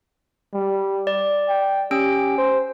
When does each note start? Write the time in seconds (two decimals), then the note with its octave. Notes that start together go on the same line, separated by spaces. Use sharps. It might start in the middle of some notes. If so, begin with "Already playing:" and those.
0.54 G3
1.07 D5
1.49 G5
1.91 C#4 G4 E6 D7
2.38 C5